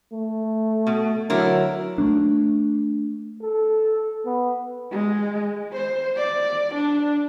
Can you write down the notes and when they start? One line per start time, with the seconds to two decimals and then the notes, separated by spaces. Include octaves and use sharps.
0.13 A3
0.87 B2
1.30 D3 F#3 E4 A#4
1.98 A3 A#3 D4
3.42 A4
4.25 B3
4.91 G#3
5.73 C5
6.17 D5
6.75 D4